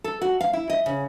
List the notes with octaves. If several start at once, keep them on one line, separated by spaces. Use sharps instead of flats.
A4
F#4
F5
E4
D#5
C#3